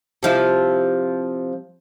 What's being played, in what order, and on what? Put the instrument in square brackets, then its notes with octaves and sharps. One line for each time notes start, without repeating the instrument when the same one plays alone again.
[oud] C3 F3 E4